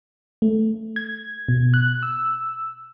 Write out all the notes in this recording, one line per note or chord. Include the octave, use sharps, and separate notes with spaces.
A3
G#6
B2
F#6
E6